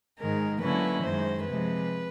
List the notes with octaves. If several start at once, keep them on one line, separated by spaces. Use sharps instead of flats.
G#2 D#3 G#3 A#4
D3 F#3 A#3 C#4 E4 B4
F#2 D#3 G#3 C5
C3 F3 G#3 B4